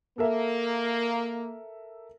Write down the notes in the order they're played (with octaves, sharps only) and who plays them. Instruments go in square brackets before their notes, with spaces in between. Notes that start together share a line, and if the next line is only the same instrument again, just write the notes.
[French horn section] A#3 [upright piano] A4 A#4 E5